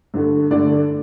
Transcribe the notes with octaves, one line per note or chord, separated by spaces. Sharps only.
G2 D3 A3
G2 D3 A3 D5